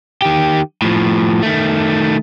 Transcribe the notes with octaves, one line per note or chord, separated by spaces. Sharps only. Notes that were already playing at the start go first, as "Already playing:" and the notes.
D#3 G4
A2 F3
D#3 A3